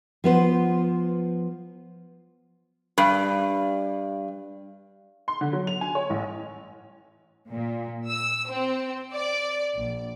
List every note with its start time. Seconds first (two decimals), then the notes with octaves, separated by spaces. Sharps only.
0.24 F3 B3 C5
2.98 G2
5.28 C6
5.41 D3
5.53 F#3
5.67 F7
5.81 G#5
5.95 C#5
6.10 A1
7.49 A#2
8.07 E6
8.48 C4
9.11 D5
9.75 A#1